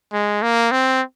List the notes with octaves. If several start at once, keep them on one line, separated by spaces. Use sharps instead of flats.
G#3
A#3
C4